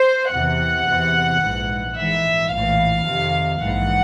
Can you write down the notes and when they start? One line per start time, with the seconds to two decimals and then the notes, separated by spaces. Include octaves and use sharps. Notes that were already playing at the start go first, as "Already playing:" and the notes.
Already playing: C5
0.32 E2 C3 E3 F#5
0.87 E2 C3 E3
1.42 A#1 G#2 E3
1.97 A#1 G#2 E3 E5
2.52 A#1 A2 E3 F5
3.06 F2 C3 D#3
3.61 A#1 G#2 E3 F#5